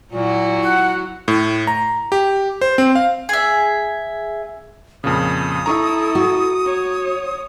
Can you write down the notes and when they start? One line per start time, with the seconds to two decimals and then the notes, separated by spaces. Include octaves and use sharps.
0.13 A#2 F#3 E4 F#4
0.63 F#5
1.28 A2
1.67 A#5
2.12 G4
2.61 C5
2.78 C4
2.95 F5
3.29 G#4 E5
5.04 F2 A#2 C#3 D#6
5.66 E4 A4 A#5 C#6
6.15 F#4
6.65 C#5